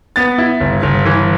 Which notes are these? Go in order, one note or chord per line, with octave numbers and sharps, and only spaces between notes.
B3 A6
E4
G1
G1
E3